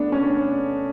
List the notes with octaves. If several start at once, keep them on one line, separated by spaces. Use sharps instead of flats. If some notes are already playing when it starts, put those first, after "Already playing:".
Already playing: A3 B3 D4
C#4